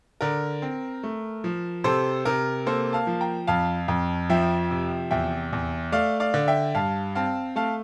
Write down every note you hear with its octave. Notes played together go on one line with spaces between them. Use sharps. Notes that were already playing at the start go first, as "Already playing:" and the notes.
D3 A#4
C4
A3
F3
C3 A4 C5
C3 A#4
A#3 A4 C5
F5 A5
F3
G5 A#5
F2 F5 A5
F2
F3 E5 G5
C3
E2 E5 G5
E2
A3 D5 F5
D5 F5
D3
E5 G5
G2 F5 A5
C4 F5 A5
A3 F5 A5